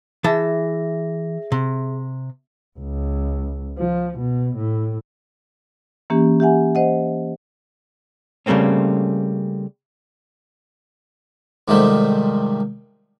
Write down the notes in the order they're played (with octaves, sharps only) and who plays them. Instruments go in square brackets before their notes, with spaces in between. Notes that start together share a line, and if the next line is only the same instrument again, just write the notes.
[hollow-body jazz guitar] E3 A5 [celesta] G#4 E5 A#6
[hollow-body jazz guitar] C3
[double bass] C#2
F3
B2
A2
[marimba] E3 A#3 C#4 G4
G4 E5 F#5 G#5
C5 D#5 F#5
[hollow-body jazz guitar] C#3 G3 A3 A#3 C4 C#4
[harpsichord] G#2 C3 D#3 F3 G3 A3